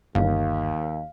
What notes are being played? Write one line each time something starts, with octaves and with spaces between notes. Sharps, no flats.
G1 D#2 F5